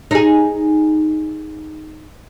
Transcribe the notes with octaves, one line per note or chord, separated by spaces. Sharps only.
D#4 G#4